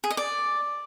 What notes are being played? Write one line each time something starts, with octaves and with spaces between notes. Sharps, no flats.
G#4
D#5
D5